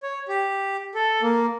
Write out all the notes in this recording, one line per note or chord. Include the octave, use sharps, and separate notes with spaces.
C#5
G4
A4
A#3